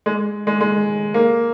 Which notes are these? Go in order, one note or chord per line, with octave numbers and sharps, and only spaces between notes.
G#3
G#3
G#3
A#3